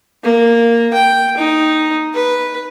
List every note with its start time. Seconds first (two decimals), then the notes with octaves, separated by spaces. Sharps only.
0.23 A#3
0.93 G5
1.37 D#4
2.14 B4